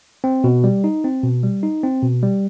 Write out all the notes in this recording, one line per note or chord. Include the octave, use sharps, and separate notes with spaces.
C4
B2
G3
D#4
C4
B2
G3
D#4
C4
B2
G3